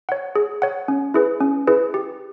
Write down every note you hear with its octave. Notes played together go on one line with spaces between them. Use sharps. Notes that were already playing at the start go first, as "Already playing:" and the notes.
C#5 F#5
G#4
C#5 F#5
C#4
E4 G#4 B4
C#4
E4 G#4 B4
G4